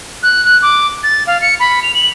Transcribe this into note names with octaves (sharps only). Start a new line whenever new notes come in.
F#6
F#6
D6
A6
F5
C#7
B5
F7
F#7